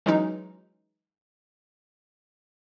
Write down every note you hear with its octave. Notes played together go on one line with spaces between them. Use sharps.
E3 F#3 G#3 C#4 D#4